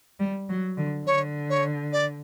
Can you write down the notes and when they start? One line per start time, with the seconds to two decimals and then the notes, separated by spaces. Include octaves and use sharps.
0.20 G3
0.49 F#3
0.78 D3
1.06 D3 C#5
1.50 C#5
1.93 D5